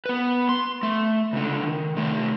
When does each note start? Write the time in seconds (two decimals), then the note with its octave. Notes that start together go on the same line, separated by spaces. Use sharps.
0.06 B3 B4
0.49 C6
0.83 A3
1.33 C#2 D3
1.63 D#3
1.97 C3 A3